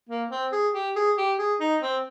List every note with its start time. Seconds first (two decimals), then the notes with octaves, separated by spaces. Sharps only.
0.09 A#3
0.31 C4
0.53 G#4
0.74 G4
0.96 G#4
1.18 G4
1.39 G#4
1.60 D#4
1.82 C4